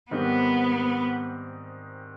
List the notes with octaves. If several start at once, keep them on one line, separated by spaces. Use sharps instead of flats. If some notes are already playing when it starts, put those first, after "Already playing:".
G#2 D#3 G3 B3 C4 D#4